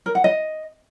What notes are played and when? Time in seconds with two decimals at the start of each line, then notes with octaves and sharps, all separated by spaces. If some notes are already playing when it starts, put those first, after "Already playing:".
0.06 A#4
0.15 F#5
0.24 D#5